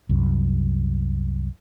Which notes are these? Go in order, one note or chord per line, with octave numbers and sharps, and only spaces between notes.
C2 F#2